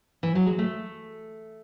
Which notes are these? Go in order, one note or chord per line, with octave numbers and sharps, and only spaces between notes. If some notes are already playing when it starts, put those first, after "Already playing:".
E3
F#3
G#3
A3